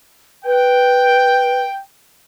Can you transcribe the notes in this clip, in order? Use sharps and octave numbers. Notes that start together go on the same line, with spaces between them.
B4 G5